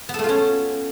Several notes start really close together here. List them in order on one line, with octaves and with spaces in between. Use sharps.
B3 A4 A3 F4 C#4